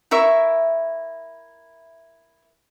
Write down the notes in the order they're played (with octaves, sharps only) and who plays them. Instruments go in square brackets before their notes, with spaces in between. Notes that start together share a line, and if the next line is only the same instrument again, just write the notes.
[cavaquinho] E4 A#4 E5 C#6